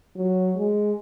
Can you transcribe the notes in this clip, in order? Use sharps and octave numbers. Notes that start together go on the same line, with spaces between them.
F#3
G#3